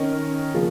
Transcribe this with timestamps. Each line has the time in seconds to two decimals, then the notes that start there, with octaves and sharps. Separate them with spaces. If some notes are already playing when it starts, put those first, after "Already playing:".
Already playing: D#3 C#4 A#4 D#5
0.54 C#3 F3 A#3 F4